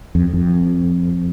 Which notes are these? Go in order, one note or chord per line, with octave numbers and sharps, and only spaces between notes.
F2
F2